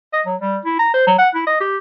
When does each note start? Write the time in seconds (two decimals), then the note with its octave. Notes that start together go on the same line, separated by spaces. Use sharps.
0.14 D#5
0.26 F#3
0.41 G3
0.65 E4
0.79 A#5
0.94 C5
1.07 F#3
1.18 F#5
1.35 E4
1.47 D#5
1.60 G4